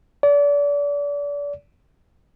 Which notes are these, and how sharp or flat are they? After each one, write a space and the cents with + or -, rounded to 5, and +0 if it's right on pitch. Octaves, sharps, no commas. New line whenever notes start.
D5 -35